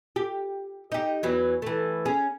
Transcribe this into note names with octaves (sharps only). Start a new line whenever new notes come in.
G4
D#4 G4
E2 E3 F#3
E3 A3
C#4 G#4